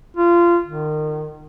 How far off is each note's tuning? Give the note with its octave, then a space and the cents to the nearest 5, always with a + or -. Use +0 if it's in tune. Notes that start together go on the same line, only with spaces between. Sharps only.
F4 -20
D#3 -30